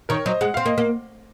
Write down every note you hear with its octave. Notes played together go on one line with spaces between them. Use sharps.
D#3 A#4 C#5
F#3 C5 D#5
G#3 F#5
C4 F5
A#3 D#5
A#3